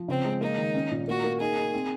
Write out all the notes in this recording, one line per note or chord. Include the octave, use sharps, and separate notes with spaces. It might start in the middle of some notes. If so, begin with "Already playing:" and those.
Already playing: F3
C#3 C4
G#3
A#3 D#4
D#3
C#4
A#2
A#3 F#4
A#3
D#4 G#4
D#4
C4